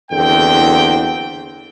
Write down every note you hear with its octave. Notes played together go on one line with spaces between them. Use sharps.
F#1 E2 D3 C4 G5